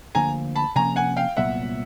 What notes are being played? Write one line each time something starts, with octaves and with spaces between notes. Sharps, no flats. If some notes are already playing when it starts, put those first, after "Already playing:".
D2 D3 F3 A#3 G#5 A#5
A5 B5
C3 F3 A#3 C#4 G#5 A#5
F#5 G#5
F5 G5
C2 A#2 F#3 B3 E5 F#5